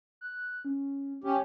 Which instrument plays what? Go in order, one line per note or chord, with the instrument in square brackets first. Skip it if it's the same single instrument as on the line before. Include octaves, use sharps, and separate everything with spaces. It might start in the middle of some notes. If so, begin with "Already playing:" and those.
[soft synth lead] F#6
C#4
[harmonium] C#4 G4